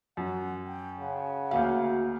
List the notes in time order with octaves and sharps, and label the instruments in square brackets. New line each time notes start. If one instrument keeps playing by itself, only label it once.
[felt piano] F#2 [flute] F#5
[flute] G5
[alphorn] C#3 [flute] F#5
[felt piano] D2 A#3 F5 [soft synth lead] F#4